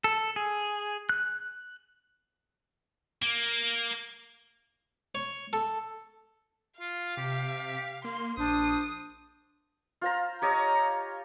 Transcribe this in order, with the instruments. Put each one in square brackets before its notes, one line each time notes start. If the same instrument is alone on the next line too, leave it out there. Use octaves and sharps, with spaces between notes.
[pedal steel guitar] A4
G#4
F#6
[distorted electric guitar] A#3
[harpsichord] C#5
A4
[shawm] F4 [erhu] F5
[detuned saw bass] C3 [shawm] G4
[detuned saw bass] A#3 [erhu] C6
[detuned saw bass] A#1 [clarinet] D4 [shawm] C5 [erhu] D#6
[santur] F4 C5 A#5
[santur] G4 C#5 D#5 [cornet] A#5